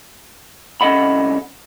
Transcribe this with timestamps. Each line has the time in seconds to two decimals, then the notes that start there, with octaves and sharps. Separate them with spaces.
0.81 C2 C#4 A4 D#5 F#5 B5